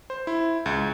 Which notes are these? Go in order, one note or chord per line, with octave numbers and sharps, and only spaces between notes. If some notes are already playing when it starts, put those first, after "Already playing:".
C5
E4
C#2